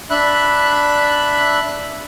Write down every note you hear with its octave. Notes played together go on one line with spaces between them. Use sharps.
D4 E5 B5 F#6